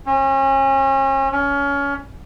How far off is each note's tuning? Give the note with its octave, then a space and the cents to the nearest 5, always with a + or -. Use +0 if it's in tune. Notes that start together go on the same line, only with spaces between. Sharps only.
C#4 -35
C#4 +25